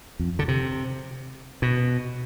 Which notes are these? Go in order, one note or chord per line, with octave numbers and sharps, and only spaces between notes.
F2
D3
C3
B2